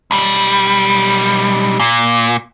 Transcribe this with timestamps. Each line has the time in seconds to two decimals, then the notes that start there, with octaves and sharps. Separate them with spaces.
0.11 B1 G3
1.80 A#2